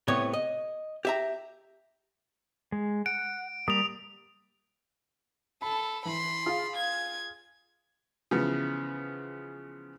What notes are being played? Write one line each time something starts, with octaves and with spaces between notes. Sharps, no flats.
A2 C3 B3 C#5
D#5
G4 E5 A#5
G#3
F#5 D7
G3 A#3 D#6 F7
A4 B5
E3 B5 C6
F4 G#4 F5
G#6
C#3 E3 F3 B3